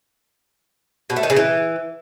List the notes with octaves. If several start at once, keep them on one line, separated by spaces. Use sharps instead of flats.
B2
A3
D#3
C#3
E3